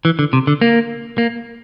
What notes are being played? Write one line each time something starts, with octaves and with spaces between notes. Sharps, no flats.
E3
D3
C3
D3
A#3
A#3